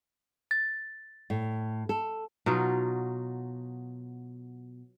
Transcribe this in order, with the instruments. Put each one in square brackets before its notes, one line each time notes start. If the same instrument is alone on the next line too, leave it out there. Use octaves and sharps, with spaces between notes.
[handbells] A6
[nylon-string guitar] A2
A4
[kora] B2 F#3 D#4 F4